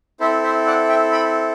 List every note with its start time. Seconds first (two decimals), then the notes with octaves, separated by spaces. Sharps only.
0.20 C4 E4 A4 C5 E5
0.43 C5 E5
0.67 D5 F#5
0.89 E5 G5
1.12 G5 B5